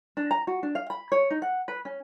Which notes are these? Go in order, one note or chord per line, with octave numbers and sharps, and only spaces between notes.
D4
A#5
F#4
D4
F5
B5
C#5
D#4
F#5
B4
C#4